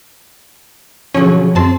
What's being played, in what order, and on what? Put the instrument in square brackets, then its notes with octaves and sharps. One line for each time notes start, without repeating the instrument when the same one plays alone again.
[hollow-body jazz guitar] B2 D3 F#3 [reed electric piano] F3 G#4 [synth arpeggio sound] C#4
[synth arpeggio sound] F#2 A5 C6 [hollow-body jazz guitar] C4